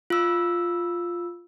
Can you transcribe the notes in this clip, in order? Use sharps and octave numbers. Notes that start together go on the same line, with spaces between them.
F4 E6